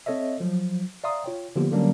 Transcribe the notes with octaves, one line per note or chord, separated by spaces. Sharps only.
C4 A4 C#5 D#5 E5
F3 F#3
D5 E5 F5 A#5 C6 D#6
F4 C#5 G5
D3 F3 A#3 B3 F4 G4
D3 F#3 G3 A#3 C#4 D4